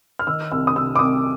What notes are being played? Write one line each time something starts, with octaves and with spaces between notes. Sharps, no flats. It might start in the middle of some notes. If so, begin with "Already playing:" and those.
F6
D#3 E6
C2 E6
D#6
C3 E6
D6
C2 D#6